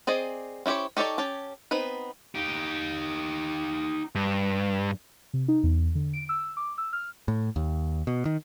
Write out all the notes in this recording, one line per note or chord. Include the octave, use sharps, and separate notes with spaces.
C4 G#4 D5 D#5
C#4 E4 G4 C5 C#5
D#4 G4 A4 C#5 D5
C#4 G4 A5
B3 C4 D#4 B4
D#4 G4
G2
C3
D#4
E2
D3
D7
E6
D6
E6
F6
A2
D#2
B2
D#3